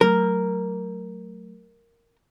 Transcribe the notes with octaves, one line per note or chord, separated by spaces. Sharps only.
F#3 A3 A#4